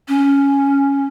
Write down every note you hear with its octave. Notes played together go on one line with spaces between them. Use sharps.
C#4